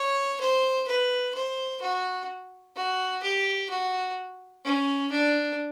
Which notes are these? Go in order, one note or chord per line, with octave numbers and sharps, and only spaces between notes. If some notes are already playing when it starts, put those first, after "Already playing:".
Already playing: C#5
C5
B4
C5
F#4
F#4
G4
F#4
C#4
D4